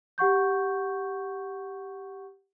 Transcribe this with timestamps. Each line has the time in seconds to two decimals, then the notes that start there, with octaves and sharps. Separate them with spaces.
0.18 G4 F#5 C#6 G6